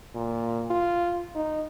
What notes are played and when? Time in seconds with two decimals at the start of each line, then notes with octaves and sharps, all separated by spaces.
0.15 A#2
0.70 F4
1.35 D#4